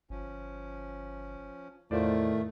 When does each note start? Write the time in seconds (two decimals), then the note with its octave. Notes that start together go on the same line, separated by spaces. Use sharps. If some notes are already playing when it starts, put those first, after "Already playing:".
0.10 G1 F3 C#4
1.91 E2 A2 D#3 A3 F4 C5 D5